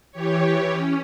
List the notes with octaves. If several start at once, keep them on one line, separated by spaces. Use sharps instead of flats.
E3 G4 C#5
C#4